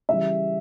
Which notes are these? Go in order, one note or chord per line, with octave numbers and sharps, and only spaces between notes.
C#3 E3 G3 E5